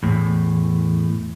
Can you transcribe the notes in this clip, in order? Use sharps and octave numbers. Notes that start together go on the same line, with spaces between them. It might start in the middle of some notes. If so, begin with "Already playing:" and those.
E2 A2